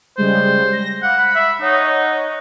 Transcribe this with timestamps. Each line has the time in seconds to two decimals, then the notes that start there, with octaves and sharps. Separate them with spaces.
0.18 C#3 G3 G#3 C5
0.72 A#6
1.03 F5 F#5 B5 D6
1.18 B5
1.35 E5
1.61 D#4 C#5 D#5 F#5